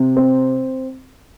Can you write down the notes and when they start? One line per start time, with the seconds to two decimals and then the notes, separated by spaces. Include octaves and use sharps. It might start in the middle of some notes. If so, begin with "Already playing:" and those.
Already playing: C3
0.16 C4